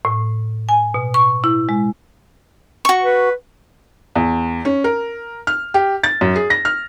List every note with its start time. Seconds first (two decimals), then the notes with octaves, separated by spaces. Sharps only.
0.05 A2
0.69 G#5
0.94 B2
1.14 C#6
1.44 E4
1.69 G#3
2.85 F#4 C#6
3.03 B4
4.15 E2
4.65 C#4
4.84 A#4
5.47 F6
5.74 G4
6.04 A6
6.21 F#2
6.36 G#4
6.50 A#6
6.65 F6